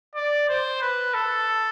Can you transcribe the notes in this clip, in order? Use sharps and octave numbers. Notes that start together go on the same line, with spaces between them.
D5
C5
B4
A4